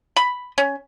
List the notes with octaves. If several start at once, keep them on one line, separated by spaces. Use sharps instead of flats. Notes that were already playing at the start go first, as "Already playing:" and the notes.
B5
C#4